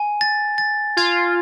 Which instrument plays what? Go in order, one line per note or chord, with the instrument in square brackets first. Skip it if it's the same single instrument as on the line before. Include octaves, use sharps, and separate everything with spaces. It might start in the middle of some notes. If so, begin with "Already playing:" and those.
Already playing: [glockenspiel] G#5
A6
A6
[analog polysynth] F4 [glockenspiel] G#6